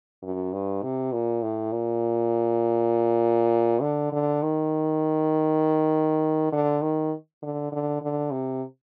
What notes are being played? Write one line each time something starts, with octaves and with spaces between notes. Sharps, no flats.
F#2
G2
C3
A#2
A2
A#2
D3
D3
D#3
D3
D#3
D3
D3
D3
C3